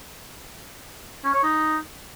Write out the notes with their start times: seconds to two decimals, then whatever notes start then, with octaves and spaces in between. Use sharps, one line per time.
1.25 C#4
1.34 C#5
1.43 D#4